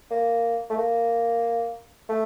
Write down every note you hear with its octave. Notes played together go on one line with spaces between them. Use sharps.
A#3
A3
A#3
A3